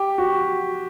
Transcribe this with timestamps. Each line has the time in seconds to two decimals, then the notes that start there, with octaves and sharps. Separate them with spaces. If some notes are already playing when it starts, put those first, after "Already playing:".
Already playing: G4
0.18 F#4